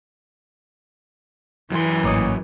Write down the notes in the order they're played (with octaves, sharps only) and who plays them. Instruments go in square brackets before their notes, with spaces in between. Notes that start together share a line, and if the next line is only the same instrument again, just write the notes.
[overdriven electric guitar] F#2 C6 [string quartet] E3
[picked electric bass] G#1 A2 [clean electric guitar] A#3 C#5 D#5